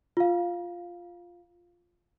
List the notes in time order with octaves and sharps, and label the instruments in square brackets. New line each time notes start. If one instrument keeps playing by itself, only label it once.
[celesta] F4 F5